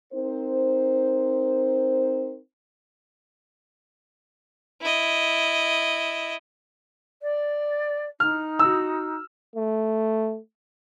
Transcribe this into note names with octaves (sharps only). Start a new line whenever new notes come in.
C4 D#4 A#4 C5
E4 D#5
D5
D#4 F6
F#4 E6
A3